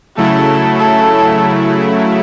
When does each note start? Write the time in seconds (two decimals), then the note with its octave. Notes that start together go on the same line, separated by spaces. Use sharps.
0.17 C#3 F#3 A3 E4 A4
0.78 A4